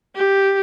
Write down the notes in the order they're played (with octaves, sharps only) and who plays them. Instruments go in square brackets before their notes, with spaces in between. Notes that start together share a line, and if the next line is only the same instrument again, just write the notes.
[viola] G4